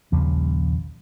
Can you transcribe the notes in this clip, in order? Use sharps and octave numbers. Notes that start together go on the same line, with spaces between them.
A#1 D#2 C#3 G3